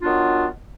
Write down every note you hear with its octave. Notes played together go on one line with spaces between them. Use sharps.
D#3 F#3 B3 D4 F4